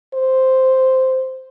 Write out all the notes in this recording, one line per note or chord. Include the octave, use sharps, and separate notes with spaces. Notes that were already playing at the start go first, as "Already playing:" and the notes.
C5